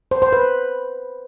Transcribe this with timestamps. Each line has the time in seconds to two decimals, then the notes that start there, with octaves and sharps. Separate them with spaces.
0.11 C5
0.22 C5
0.33 B4